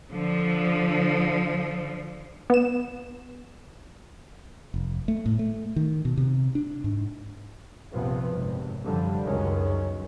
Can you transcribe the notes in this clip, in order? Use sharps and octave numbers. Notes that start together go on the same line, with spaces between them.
D3 F3
B3 E7
F1
A3
A2
A3
D#3
B2
C3
D4
G#2
A#1 G2 C3 F3 B3
G#1 F#2 C3
F#2 D3 F3 G3
C#2 F#2 D#3 F#3 G#3 C#4